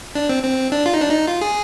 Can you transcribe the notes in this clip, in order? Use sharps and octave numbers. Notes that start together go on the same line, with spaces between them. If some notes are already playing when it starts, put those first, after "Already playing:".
D4
C4
C4
D4
F4
D#4
D4
D#4
F4
G#4